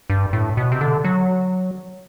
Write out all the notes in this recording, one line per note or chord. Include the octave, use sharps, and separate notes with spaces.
G2
A2
B2
C3
D3
F#3